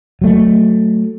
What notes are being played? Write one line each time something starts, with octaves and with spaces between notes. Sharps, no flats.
F#3 A3